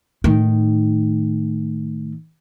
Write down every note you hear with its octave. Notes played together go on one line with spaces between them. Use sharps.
A2 D#3